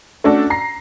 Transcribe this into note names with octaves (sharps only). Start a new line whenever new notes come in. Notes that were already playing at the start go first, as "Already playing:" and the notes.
A3 C#4 D4 F#4 A4
A#5 A#6 C7